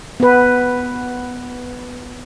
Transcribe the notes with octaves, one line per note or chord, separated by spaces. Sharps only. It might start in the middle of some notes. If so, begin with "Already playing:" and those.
B3 B4